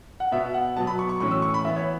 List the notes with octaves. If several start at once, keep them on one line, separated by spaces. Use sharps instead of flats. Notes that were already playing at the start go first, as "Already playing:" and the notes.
F#5
B2 B3 E5
F#5
B2 F#3 B3 A5
B5
C#6
C#6
A2 E3 C#4 C#6
E6
C#6
B5
E3 B3 E5
C#5